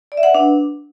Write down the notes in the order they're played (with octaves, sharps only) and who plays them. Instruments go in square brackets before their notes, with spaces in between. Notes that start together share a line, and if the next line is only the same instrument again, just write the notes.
[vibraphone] D5
E5
F#5
B4
D4